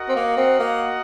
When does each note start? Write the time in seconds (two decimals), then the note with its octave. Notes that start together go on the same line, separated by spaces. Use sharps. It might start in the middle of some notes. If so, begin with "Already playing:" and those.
Already playing: F#4 A#4 D#5 F#5
0.08 C4
0.16 A#3
0.37 C4
0.60 A#3